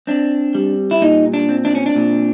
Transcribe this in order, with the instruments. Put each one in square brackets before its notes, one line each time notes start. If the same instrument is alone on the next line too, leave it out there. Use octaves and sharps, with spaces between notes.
[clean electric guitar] C4 D4
G3
E4
A#2 D#4
D4
C4
D4
C#4
D4
A#2